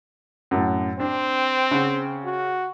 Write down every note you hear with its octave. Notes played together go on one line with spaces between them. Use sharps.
F#2 A2
C4 D4
C#3 F#5
F#4